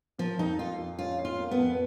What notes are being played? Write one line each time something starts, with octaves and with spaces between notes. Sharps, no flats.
F3 A#3
F2 D#4
F2 F4
F3
C#4 F4
C#4
F4
A#3
B3
F2